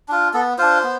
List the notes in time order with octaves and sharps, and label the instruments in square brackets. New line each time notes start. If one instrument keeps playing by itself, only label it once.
[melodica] D4 F4
B3 A4
D4 F4 C5
B3